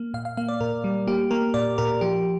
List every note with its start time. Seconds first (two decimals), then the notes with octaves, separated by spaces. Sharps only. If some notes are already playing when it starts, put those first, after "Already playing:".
Already playing: A#3
0.14 A#2 F5
0.25 F5
0.37 A#3 F5
0.48 D5
0.61 A#2 A#4
0.84 G3
1.07 A#3 G4
1.31 A#3 A#4
1.54 A#2 D5
1.78 A#2 A#4
2.01 F3 G4